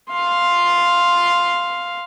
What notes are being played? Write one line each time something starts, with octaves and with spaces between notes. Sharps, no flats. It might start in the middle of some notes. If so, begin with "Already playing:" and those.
F5 C6